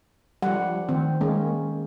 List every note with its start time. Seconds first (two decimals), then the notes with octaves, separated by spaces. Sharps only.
0.43 F3 G3 F#5
0.89 D#3 A3 C4
1.21 G#3 A#3 C#4